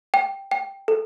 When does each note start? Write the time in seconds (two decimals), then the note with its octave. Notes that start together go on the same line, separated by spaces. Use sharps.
0.14 G5
0.51 G5
0.88 A4